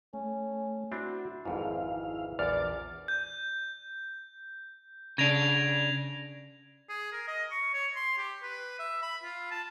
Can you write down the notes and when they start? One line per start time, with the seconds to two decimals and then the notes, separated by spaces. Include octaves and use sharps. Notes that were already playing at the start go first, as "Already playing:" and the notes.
0.13 A3 C#4
0.92 C4 D4 E4 F#4
1.45 G#1 F2 G#2 E3 E4 F5
2.39 A#1 E2 D5 D6 F6 A6
3.08 G6
5.18 C#3 D4 G#6 A#6 F7
6.89 G#4
7.12 A#4
7.27 D#5
7.52 C#6
7.74 C#5
7.96 C6
8.18 G4
8.42 B4
8.79 E5
9.02 B5
9.24 F4
9.51 A5